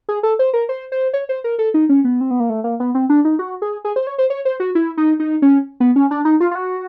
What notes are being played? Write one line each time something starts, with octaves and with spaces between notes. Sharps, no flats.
G#4
A4
C5
A#4
C5
C5
C#5
C5
A#4
A4
D#4
C#4
B3
C4
B3
A#3
A3
A#3
B3
C4
D4
D#4
F#4
G#4
G#4
C5
C#5
C5
C#5
C5
F#4
E4
D#4
D#4
C#4
B3
C#4
D4
D#4
F4
F4
F#4